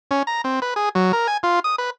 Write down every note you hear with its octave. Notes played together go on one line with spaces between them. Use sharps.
C#4
A#5
C4
B4
G#4
F#3
A#4
G#5
F4
D#6
B4